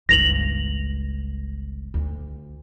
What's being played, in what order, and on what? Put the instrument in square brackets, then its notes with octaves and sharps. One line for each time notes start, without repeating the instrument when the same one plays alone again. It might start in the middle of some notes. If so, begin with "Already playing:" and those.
[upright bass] G1 C#2 [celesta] A#6 F7 F#7
[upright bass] D2